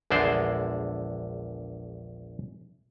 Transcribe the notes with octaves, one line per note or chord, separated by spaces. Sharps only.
A#1 E2 D3 G#3 C5 D5